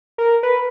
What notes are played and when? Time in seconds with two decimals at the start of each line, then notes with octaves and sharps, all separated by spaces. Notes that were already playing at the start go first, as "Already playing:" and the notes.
0.18 A#4
0.43 B4